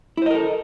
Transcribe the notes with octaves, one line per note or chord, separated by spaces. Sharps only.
E4 A4 A#4 C5 D#5